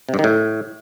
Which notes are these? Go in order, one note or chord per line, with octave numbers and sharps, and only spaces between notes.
C3
G2
D#3
A2